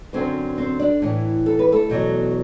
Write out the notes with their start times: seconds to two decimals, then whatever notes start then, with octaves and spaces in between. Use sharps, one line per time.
0.13 F#2 D3 F#3 C4 C5
0.58 C4 C5
0.80 D4 D5
1.02 A2 E3
1.46 A4
1.59 B4
1.72 A3 A4
1.90 E2 B2 F#3